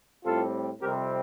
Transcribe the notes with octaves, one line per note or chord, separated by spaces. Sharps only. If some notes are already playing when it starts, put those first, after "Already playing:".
A2 G3 C4 F4 A4
F2 C3 G3 C4 G4 A#4